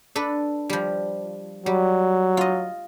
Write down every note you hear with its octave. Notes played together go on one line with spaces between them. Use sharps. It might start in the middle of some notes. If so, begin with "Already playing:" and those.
D4 A4 B4
F3 G3
F#3 G3
F4 D#5